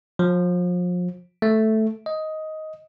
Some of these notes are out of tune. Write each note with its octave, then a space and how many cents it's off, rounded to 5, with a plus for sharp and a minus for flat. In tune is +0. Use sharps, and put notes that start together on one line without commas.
F3 +35
A3 -5
D#5 +10